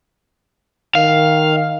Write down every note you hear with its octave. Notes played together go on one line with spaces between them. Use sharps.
D#3 F5